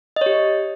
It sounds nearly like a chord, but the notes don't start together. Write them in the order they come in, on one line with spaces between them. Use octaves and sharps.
D#5 C#5 G4